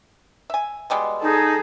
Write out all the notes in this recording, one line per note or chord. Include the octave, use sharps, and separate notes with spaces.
E5 G#5
B2 G3 G#3
D#4 G#4 A4